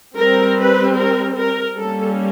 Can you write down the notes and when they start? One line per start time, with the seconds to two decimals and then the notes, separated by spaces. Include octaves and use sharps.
0.16 G3 C4 A#4
0.58 B4
0.98 A#4
1.38 A#4
1.78 G3 A#3 C#4 A4